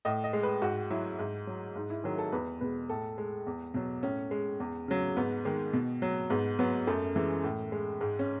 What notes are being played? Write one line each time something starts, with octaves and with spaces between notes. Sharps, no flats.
A2 D#5
D#5
G#3
B4
G#2 F#4
F#3 E4
G#2
F#3
G#2 D#4
E4
D#3 F#3 G#4
A4
E2 B4
B2 G#3 B4
A2 A4
G#3
E2
B2 F#3
A2 C#4
G#3
E2
C#3 F#3
G#2 B3
D#3 G#3
B2
F#3
G#2 B3
F#3 B3
F#2 A3
E3 G#3
A2
G#3
G#2 G#3
C#4